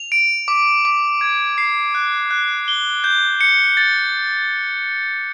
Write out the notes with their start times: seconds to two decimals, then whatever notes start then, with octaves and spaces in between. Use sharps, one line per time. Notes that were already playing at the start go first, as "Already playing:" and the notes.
Already playing: F7
0.12 D7
0.48 D6
0.85 D6
1.21 G#6
1.58 C7
1.95 F#6
2.31 F#6
2.68 G7
3.04 G6
3.41 C#7
3.77 A6